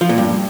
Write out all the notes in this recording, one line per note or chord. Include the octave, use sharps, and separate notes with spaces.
F3
A#2
G2